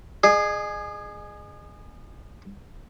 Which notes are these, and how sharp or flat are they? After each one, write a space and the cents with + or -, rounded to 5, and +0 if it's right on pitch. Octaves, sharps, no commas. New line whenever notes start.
G#4 +0 D#5 -40